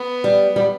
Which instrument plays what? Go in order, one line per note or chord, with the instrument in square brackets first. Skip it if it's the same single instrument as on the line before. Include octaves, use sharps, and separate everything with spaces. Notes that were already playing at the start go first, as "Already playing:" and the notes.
Already playing: [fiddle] B3
[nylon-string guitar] G3
G3